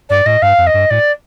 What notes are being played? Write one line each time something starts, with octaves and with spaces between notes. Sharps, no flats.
G2 D5
A2 D#5
G2 F5
F2
D#5
G2
A2 D5